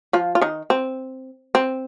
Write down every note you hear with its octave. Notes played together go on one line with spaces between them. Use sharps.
F3 F4
F4
D#3 D#4
C4
C4